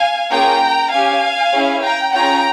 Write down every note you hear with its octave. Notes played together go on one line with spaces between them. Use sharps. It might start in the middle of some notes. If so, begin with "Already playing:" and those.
Already playing: F5 G#5
A#3 C#4 F4 G#4 G5 A#5
C#4 G4 F5 G#5
C#4 E4 G#4
G5 A#5
C#4 F4 G#4 G5 A#5